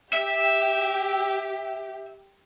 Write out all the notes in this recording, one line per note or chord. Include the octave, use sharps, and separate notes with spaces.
G4 E5